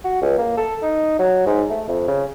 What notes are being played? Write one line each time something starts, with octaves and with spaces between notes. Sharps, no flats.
F#4
C#2
A#3
A4
D#4
F#3
G#2
A3
F2
C#3